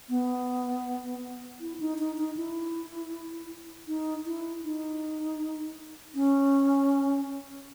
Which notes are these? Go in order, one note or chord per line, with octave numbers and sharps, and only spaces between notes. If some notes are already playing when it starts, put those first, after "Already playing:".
B3
E4
D#4
D#4
D#4
E4
D#4
E4
D#4
C#4